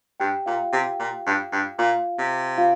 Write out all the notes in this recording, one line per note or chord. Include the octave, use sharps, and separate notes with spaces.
G2 G4 G5
A#2 F4 F5
C3 G4 G5
A#2
G2
G2
A#2 F4 F5
C3
F4 F5